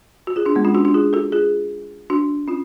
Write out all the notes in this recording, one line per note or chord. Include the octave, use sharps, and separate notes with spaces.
F#4
F4 G#4
D4 F#4
G#3 B3
C#4 F4
D4 F#4
D4 F#4
F4 G#4
F#4 A4
F4 G#4
D4 F#4
C#4 F4